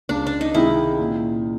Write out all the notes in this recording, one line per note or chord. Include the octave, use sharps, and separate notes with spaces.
C#2 D4
D4
D#4
C3 D#3 G#3 E4
A#2